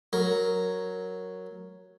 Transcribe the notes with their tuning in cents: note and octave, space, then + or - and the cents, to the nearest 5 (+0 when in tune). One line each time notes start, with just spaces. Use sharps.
F#3 +0 A#4 +0